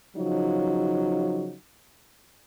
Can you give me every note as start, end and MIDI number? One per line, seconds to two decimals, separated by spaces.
0.17 1.54 49
0.17 1.54 53
0.17 1.54 54
0.17 1.54 63